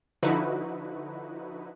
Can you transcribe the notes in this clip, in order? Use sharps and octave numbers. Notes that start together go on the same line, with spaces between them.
D3 F3 D#4 E4 F#4 B4